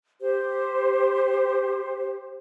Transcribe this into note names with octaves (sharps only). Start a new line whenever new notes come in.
G4 C5